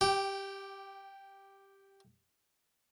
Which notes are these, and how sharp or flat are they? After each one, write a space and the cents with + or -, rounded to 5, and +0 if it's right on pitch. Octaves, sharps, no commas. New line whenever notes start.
G4 +0 G5 -25